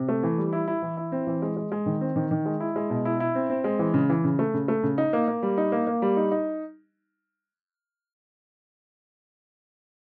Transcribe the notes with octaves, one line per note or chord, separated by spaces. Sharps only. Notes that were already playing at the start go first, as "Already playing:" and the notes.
Already playing: C3
A3
E3
G3
E4
E4
E3
E4
C4
E3
G#3
G#3
G#3
D#3
C4
D#3
D#3
G#3
E4
G#3
B2
E4
E4
C4
C4
G#3
E3
C#3
E3
C#3
A3
C#3
A3
C#3
D#4
A#3
A#3
G3
D#4
A#3
A#3
G3
D#4
D#4